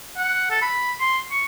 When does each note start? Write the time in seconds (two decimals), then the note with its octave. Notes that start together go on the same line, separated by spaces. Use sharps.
0.17 F#5
0.50 A4
0.62 B5
1.01 C6
1.31 C#6